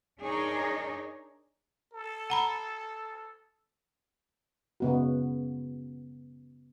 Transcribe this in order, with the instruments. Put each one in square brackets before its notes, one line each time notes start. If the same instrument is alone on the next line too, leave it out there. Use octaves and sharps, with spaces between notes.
[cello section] D4 D#4 G#4 A#4 C#5 D#5
[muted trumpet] A4
[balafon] F#5 A#5 B5
[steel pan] C#3 B3 F#4